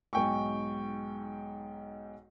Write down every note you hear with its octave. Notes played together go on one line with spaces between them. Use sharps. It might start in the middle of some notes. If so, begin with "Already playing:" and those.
B1 G#2 G5 G#5 C#6